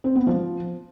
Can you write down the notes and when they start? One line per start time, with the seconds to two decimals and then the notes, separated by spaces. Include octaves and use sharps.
0.04 C4
0.15 B3
0.27 F3